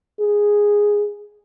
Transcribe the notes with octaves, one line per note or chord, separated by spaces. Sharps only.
G#4